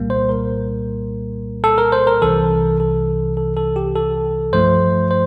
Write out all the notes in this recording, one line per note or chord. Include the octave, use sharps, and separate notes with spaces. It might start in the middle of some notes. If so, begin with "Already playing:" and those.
Already playing: C2 A#2 G3 A#3
C5
A#4
A4
A#4
C5
A#4
C2 C3 E3 A4
A4
A4
A4
G4
A4
G2 F3 A3 C5
C5